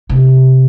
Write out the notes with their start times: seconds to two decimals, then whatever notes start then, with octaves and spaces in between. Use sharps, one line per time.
0.09 C3